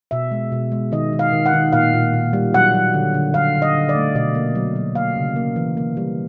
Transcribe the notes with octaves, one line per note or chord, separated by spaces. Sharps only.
B2 E5
G#3
B2
G#3
D#3 D#5
D#3
F5
D#3
F#5
D#3
A#2 F5
A#2
A#2
G3
F#3 F#5
F#3
D3
D3
D3 F5
D3
D#5
D3
D5
A3
B2 D#5
A#3
F#3
F#3
A#3 F5
C#3
A#3
E3
A#3
G3